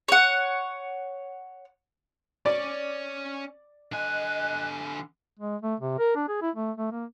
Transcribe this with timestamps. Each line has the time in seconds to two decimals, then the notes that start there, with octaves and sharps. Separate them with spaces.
0.08 C#5 F#5
2.46 C#4 C#5 D5
3.92 D3 D#5 G#5 F#6
5.39 G#3
5.62 A3
5.80 C3
5.99 A#4
6.16 D4
6.28 G#4
6.42 E4
6.55 A3
6.77 A3
6.92 A#3